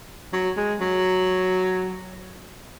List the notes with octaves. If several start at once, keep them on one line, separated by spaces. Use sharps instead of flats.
F#3
G#3
F#3